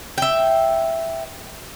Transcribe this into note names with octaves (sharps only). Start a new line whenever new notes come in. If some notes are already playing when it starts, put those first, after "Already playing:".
E5 G5